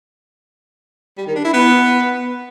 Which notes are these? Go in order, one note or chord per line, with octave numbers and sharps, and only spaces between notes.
G3
D#3
D4
E4
B3